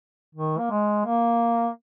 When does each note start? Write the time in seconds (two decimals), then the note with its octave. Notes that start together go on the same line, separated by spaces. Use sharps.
0.35 D#3
0.58 A#3
0.70 G#3
1.06 A#3